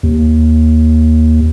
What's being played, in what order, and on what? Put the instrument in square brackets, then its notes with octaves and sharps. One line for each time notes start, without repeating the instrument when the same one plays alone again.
[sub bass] D#2